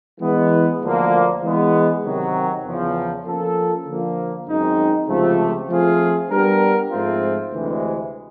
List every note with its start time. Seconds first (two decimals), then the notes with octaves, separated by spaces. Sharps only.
0.21 E3 G#3 B3
0.82 D2 D3 F3 A#3
1.42 E3 G#3 B3
2.03 C3 D#3 F#3
2.64 E2 C#3 F3
3.25 F3 A#3 C#4 F4 A4
3.86 D3 F3 A#3
4.46 F#2 D#3 G#3 C4 D#4
5.08 C#2 C3 F3 A3
5.69 F3 A3 C4 F4 G#4
6.30 G3 B3 D4 G4 A#4
6.91 G#2 F3 A3 C4 F4
7.51 D2 C3 E3 G#3